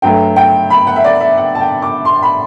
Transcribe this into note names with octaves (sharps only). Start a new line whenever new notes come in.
G2 F#3 A3 G5
G5
B5
F#5
E5
D5
E5
F#5
A5
G5
D6
C6
B5